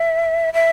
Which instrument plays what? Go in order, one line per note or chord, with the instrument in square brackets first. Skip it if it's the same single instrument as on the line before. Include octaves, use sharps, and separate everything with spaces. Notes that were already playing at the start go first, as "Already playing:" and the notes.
Already playing: [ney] E5
E5